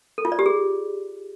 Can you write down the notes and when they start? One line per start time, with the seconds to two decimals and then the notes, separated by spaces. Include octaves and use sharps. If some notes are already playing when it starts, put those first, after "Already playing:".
0.18 A4
0.25 F4
0.32 D5
0.39 G4
0.46 G#4